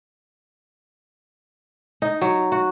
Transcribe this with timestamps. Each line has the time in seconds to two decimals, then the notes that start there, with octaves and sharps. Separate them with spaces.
2.02 D#4
2.21 F#3
2.52 F#4